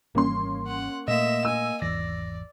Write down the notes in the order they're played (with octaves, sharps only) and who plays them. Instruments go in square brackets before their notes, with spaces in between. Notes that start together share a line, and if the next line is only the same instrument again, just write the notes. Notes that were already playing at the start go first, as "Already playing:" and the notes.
[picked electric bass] G#1 E3 G3 [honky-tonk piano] A#3 C#4 C6
[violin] F#5
[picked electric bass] A#2 A3 [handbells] A#3 D#5 [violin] E5 E7
[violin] G#5 [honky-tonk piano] E6
[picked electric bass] G#1 E2 E3 [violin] D5 [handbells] A#6